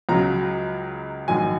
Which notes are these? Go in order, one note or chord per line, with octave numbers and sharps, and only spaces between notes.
C#2 C#3 F#3 A#5
A#1 G#2 D#3 F#3 G#5